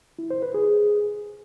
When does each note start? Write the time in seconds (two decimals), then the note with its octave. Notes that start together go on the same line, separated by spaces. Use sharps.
0.19 E4
0.30 C5
0.42 B4
0.54 G#4